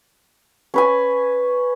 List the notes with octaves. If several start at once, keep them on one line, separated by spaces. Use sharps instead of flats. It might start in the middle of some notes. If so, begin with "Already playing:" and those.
C#4 B4 G#5